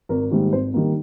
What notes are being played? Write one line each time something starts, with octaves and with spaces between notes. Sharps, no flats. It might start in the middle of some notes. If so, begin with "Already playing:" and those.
G#1 A#4
G#2 D#3 G3 A#3
G#1 C5
D#3 G3 A#3